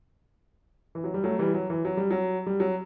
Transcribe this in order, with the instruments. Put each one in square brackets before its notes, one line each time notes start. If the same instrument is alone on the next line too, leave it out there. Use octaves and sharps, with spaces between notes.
[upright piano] E3
F#3
G3
F#3 A3
E3 G3
F#3
E3
F#3
G3
F#3
G3
F#3